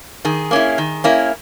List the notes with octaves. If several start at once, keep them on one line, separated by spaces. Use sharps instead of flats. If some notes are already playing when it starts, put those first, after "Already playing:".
D#3 G#4
A#3 C#4 E4
D#3
A#3 C#4 E4